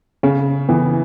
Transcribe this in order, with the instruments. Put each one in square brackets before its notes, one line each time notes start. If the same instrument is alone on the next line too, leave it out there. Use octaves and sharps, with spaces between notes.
[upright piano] C#3 [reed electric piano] C#4
[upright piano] E3 [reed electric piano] B3